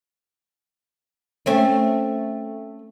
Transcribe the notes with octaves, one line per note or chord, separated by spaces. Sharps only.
A3 C4 C#4